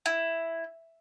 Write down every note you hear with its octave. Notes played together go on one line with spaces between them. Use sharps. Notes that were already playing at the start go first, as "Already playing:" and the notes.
E4